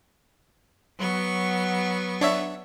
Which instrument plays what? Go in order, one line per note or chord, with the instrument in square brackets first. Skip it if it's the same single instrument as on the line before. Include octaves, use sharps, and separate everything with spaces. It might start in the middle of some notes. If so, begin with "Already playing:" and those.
[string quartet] F#3 B3 C#6
[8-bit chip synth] D4 C#5 E5